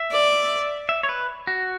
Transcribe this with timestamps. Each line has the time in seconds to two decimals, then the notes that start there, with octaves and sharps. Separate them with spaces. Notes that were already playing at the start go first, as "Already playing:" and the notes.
Already playing: E5
0.12 D5
0.89 E5
1.03 C#5
1.09 B4
1.47 F#4